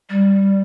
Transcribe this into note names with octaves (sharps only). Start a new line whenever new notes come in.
G3